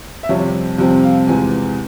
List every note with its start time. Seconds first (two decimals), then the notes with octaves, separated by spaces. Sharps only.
0.23 E5
0.29 F2 C3 G3 C4 C#5
0.78 F2 C3 G3 C4
1.03 F5
1.28 E2 C3 F3 G#3 G#5